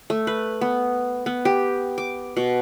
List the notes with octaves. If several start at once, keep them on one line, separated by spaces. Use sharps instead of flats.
A3
B4
B3
B3
G4
D6
B2